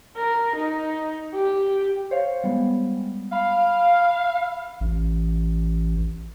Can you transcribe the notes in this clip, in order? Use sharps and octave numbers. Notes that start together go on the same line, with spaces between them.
A#4
D#4
G4
C5 C#5 F5
G3 G#3 B3
F5 B5
A1